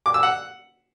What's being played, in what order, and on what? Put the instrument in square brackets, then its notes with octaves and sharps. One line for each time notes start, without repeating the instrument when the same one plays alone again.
[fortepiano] D6
E6
F#5